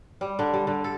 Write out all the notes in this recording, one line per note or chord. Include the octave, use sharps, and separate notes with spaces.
G3
D3
G3
D3
A4